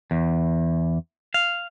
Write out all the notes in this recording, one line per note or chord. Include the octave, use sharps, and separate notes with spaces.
E2
F5